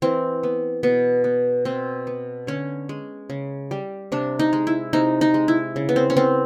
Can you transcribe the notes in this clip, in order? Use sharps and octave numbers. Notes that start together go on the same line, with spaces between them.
E3 C4
B3
B2 B3
B3
B2 C4
B3
D3 C#4
G#3
C#3
G3
C3 D4
D#4
G#3
E4
C3 D#4
D#4
G#3
E4
C#3
B3
C4
C#4
B3 C4